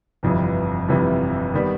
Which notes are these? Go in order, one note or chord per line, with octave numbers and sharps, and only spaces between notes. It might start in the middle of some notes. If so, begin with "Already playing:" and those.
G1 F2 C3 E3
G1 F2 C3 E3
D#3 G3 B3